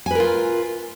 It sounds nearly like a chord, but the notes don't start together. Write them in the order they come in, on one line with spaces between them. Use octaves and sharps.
G#5 B4 A#4 F4